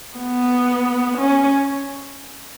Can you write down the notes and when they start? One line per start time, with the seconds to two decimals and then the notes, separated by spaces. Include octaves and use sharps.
0.18 B3
1.18 C#4